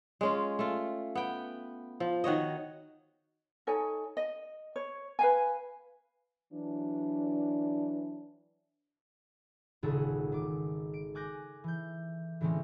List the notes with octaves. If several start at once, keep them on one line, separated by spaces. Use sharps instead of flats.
G#3 C#4 F4
A3 F4
B3 G5
F3
D#3 F#4 C#5 D#5
D#4 A4 C#5 G#5
D#5
C#5
B4 F5 G#5
E3 F#3 D4
D#1 G#1 C#3 G#4 A4 F#5
D#3 D6
D7
G#5 D6 F#6 G6 A#6
E3 G6
A2 D3 E3 G#3 C4 C#4